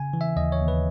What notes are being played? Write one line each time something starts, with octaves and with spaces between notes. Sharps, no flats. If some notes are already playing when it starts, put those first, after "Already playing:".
Already playing: C#3 G#5
E3
E5
D#2 D#5
C#5
D#2
B4